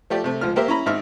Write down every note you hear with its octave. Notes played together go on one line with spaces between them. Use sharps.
F3 A3 G4 D5
C3 A3
C#2 F3 F4 F6
A#3 G4 A#4 C5 E5
C#4 E4 A#5 B5
G#1 D#4 E5 F6